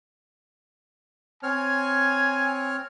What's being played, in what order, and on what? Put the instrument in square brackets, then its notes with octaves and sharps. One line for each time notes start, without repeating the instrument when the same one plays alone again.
[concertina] C4 C#5 F6 [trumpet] G#5